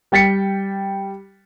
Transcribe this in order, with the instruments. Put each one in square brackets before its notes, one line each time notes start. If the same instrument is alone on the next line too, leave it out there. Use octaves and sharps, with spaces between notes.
[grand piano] G3 G5 A6 B6 C#7